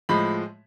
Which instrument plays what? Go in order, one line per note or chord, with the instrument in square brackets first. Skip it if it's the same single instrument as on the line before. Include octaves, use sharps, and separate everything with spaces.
[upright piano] A2 F3 G#3 B5